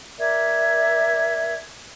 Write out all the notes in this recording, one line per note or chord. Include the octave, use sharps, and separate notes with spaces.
A#4 D5 E5 G#6